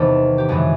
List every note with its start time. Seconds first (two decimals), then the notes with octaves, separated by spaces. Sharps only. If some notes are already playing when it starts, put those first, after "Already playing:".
Already playing: E2 C3 D#3 A4
0.38 G4
0.49 F#2 C#3 E3 G#3 G#4